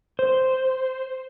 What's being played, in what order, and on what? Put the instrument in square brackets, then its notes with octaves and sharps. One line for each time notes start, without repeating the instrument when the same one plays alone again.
[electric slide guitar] C5